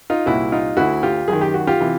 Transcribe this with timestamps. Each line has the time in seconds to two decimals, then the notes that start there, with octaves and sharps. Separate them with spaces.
0.10 D#4 F4
0.26 C2 A#2 E4 F#4
0.52 D#4 F4
0.77 D2 D3 E4 F#4
1.03 F4 G4
1.28 F#2 D#3 G#4
1.41 G4
1.54 F#4
1.67 F4 G4
1.80 C3 E3